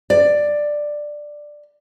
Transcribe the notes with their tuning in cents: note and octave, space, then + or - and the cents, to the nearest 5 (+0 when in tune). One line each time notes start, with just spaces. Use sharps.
D5 +10